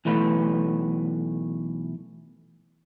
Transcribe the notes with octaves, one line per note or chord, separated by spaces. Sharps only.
B1 E3 A3 B4